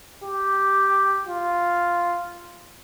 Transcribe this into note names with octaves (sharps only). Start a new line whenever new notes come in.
G4
F4